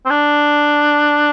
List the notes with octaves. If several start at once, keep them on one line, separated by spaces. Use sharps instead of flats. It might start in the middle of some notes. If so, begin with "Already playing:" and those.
C4
D4